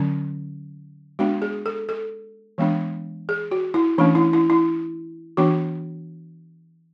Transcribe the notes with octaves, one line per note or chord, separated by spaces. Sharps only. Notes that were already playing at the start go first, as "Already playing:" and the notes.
Already playing: D3 F#3 C#4
G#3 B3 D4 F#4
G#4
A4
A4
E3 G#3 B3 D4
G#4
F#4
E4
E3 A3 C#4 D4
E4
E4
E4
E3 B3 D4 F#4